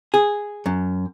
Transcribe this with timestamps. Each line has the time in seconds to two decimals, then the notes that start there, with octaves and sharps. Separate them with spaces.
0.14 G#4
0.66 F#2